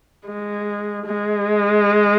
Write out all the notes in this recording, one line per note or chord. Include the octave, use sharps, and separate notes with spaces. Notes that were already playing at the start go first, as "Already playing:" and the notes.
G#3
G#3